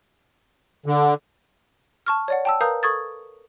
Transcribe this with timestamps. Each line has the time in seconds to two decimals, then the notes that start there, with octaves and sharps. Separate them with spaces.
0.86 D3
2.06 A5 C#6 F6
2.28 C#5 D5 F#5
2.45 G5 A5 E6
2.61 A#4 B4 F5 A#5 D#6 G6
2.83 A4 C#6 D#6 G#6 A6